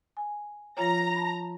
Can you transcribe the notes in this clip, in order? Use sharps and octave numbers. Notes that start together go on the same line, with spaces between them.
G#5
F3 F4 C#5 A#5 A#6
A5 B5